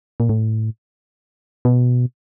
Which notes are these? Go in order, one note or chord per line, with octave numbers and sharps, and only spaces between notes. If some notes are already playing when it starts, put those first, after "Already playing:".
A#2
A2
B2